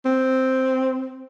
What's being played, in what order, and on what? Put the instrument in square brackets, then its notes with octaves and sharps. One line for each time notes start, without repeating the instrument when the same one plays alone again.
[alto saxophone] C4